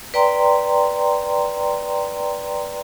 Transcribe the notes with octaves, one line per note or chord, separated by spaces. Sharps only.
B4 D5 G5 A#5 C6